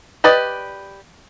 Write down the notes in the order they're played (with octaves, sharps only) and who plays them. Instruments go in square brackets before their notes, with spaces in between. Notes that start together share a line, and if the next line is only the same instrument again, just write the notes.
[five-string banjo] G4 B4 D5 D#5